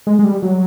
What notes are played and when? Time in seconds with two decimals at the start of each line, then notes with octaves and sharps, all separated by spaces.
0.07 G#3
0.19 G#3
0.24 G3
0.43 F#3